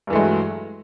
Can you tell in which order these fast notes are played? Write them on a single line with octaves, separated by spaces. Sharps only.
G2 E3 A3 G#3 F#3